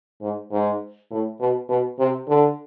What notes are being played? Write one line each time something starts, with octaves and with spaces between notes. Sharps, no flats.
G#2
G#2
A2
B2
B2
C3
D3